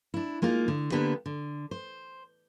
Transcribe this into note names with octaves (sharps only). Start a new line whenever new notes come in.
D4 E4
G#3 A#3 D#4 F4
D3
D3 A#3 B3 D4 G4 B4
D3
C5